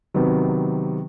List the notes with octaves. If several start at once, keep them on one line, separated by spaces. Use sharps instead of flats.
C3 D#3 F#3 B3